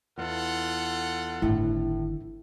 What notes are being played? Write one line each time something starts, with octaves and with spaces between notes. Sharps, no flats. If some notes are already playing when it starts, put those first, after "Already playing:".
E2 F4 A4 F#5
G1 A2 D#3 E4